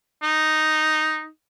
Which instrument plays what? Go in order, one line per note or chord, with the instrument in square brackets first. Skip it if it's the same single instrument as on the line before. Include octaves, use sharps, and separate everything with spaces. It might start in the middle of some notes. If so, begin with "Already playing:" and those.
[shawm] D#4